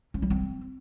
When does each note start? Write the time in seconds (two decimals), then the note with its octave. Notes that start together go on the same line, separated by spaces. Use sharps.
0.14 C#4
0.22 G3
0.30 C4